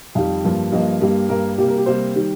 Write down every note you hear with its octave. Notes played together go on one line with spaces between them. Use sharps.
F2 D#3 G3 F5
G2 F3 A#3
G2 F3 A#3 D#5
G2 G3 A#3
G2 G3 A#3 A#4
C3 G3 A#3 G4
A#4
G4
C3 G3 A#3 C5
D#3 G3